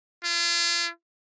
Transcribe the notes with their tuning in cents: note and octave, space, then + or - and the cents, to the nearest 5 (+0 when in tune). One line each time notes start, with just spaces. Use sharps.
F4 -35